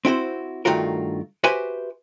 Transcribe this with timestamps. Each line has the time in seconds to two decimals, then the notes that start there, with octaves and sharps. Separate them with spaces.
0.05 C4 E4 F#4 C5
0.65 G2 D#3 A3 F4 F#4 A#4
1.44 F#4 G4 B4 C5 E5 G#5